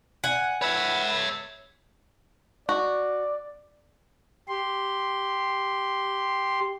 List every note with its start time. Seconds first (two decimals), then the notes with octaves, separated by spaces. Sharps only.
0.24 F#5 G#5
0.62 B4 C#5 E5
2.69 F#4 D5
4.49 G4 C6